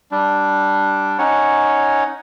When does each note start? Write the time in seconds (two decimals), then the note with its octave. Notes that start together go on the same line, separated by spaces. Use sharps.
0.11 G3 D4
1.18 C#4 D#4 C#5 F#5